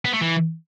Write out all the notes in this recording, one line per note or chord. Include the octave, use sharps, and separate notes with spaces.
B3
A3
E3